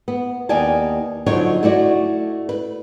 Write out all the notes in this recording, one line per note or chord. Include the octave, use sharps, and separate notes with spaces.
B3
D#2 B3 D#4 D5 G#5 A5
D3 F3 F#3 D#4 C#5
A3 E4 F#4 D5
B4